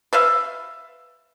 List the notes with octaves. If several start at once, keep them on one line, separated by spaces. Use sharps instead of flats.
B4 E5 F5